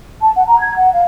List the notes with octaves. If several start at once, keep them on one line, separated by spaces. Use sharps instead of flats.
A5
F#5
A#5
G#6
F#5
F5